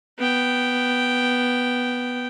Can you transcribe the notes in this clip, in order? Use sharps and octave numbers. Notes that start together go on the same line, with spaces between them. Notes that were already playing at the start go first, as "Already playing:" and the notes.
B3 G5